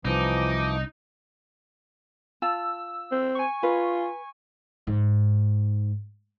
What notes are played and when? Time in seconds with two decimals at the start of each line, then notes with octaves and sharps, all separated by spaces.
0.05 C2 E3 F3 D#4 D6
2.42 F4 A5 E6
3.12 C4
3.35 G#5 C#6
3.63 F4 B4
4.87 G#2